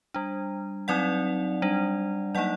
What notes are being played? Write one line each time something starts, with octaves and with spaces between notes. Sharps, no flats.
G3 D4
F#3 C4 D#4 D5 F#5
G3 D4
F#3 A#3 D#4 D5 F#5